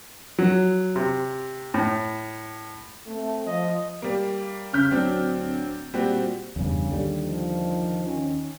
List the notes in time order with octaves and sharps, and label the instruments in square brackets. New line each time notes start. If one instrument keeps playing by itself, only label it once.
[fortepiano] F#3
C3
A2
[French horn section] A3 C4
[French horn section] F3 [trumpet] D#5
[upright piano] G3 A#3
[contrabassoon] C#3 [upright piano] F6 G6 B6
[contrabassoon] D1 [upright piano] F#3 C4 D4
[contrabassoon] A#2 [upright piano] G3 C4 F#4
[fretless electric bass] E2 G2 [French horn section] C#3
[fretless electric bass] D#2 D3 G3
[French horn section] D#3 F3
D#3 C#4